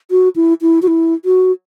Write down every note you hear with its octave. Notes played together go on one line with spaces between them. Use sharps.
F#4
E4
E4
F#4
E4
F#4